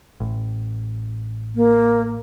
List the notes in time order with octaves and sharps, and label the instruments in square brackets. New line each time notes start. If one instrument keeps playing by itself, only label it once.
[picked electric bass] A1
[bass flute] A#3